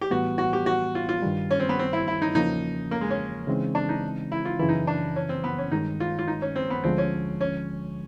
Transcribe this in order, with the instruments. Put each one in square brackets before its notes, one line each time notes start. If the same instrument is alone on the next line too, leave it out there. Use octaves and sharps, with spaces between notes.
[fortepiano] G4
[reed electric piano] A2 E3 G3 B3 [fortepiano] F#4
[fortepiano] F#4
G4
F#4
F4
F4
[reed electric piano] G2 D#3 G3
[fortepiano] C#4
C4
B3
C4
E4
E4
D#4
[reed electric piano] E2 C#3 F3 A#3 C#4 [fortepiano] D#4
[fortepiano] A#3
G#3
C#4
[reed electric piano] C#3 E3 G#3 C4 D#4
[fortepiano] D4
D#4
E4
F4
[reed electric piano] F#2 C#3 E3 [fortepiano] E4
[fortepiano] D#4
D4
C#4
C4
B3
C#4
[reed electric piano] G2 D#3 G#3 [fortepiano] D#4
[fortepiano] F4
F4
D#4
C#4
C4
B3
[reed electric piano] D2 D3 F3 G#3 [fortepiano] C4
[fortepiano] C#4
C#4